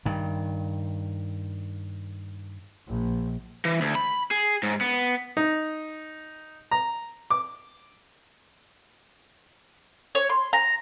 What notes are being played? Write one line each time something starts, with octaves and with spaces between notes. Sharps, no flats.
G2 D#3
A#1
E3
D2
B5
G#4
G#2
B3
D#4
A#5
D6
C#5
C6
A#5